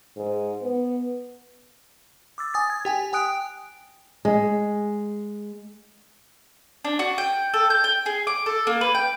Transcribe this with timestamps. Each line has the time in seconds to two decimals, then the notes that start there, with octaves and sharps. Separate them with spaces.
0.17 G#2
0.63 B3
2.38 D6 E6 A6
2.54 G#5 D#6 A6
2.70 G#6
2.85 G4 G5 G#5
3.13 G5 G#5 D#6 F#6 D7
4.25 G#3
6.85 D4
6.99 F#4
7.18 G5
7.54 A4
7.70 G6
7.84 G5
8.06 G#4
8.27 D6
8.46 A4
8.67 A#3
8.81 B4
8.95 G5